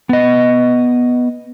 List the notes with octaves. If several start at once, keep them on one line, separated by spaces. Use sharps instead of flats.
B3 D#5